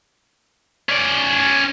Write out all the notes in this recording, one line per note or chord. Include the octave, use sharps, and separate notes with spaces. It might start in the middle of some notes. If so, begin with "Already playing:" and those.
C#4 D5